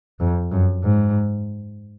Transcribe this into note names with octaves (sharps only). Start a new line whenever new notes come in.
F2
F#2
G#2